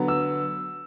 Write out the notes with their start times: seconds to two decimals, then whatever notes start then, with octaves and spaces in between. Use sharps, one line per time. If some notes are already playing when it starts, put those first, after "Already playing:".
Already playing: D3 F#3 B3
0.08 E6